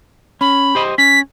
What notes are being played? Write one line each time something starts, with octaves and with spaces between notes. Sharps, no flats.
C#4 B5
G4 C5 D#5
C#4 B6